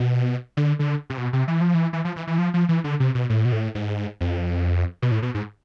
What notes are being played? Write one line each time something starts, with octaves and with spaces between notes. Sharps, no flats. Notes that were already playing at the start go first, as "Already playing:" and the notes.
Already playing: B2
D3
D3
C3
B2
C3
E3
F3
E3
E3
F3
E3
E3
F3
F3
E3
D3
C3
B2
A2
B2
A2
G#2
F2
B2
A2
B2
G#2